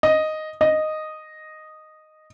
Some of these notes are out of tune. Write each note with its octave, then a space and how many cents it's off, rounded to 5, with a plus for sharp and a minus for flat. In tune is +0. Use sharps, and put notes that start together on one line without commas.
D#5 +0
D#5 -5